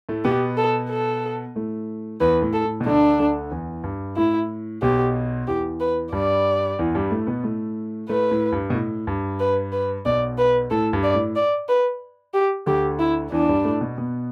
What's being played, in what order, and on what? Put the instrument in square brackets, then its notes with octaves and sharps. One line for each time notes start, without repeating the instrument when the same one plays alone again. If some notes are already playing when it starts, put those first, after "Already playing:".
[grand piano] A2 A3
[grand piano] B2 B3 [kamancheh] G4
[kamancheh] A4
A4
[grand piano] A2 A3
[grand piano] E2 E3 [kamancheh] B4
[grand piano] A2
[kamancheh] A4
[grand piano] A2
B2
[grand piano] D2 D3 [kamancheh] D4
[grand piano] D2 D3
E2 E3
G2
[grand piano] A2 [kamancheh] E4
[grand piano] B1 B2 [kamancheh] G4
[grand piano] E2 E3 [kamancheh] G4
[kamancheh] B4
[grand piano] G2 G3 [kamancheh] D5
[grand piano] E2 E3
G2 G3
A2 A3
B2 B3
A2 A3
[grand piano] A2 A3 [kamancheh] B4
[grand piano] A2
G2
B2
A2
G2
[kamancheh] B4
B4
[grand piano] B1 B2 [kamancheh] D5
[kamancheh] B4
[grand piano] A2 [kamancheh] A4
[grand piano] G2
[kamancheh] D5
[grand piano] A2
[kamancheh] D5
B4
G4
[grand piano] D2 D3 [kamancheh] G4
[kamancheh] E4
[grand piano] E2 E3 [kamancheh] D4
[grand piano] G2 G3
A2 A3
B2 B3
B2 B3